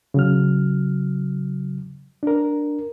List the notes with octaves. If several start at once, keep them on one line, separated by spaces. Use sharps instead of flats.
C#3 F#3 F6
D4 A#4